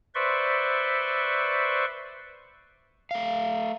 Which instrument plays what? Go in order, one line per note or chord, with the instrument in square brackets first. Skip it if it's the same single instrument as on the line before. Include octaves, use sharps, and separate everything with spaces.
[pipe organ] B4 C5 D5 E5 C6 C#6
[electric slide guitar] A3 F5